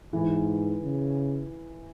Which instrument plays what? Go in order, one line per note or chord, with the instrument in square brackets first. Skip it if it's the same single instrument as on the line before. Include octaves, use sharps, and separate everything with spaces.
[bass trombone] G#2 [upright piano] E3
[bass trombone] C#3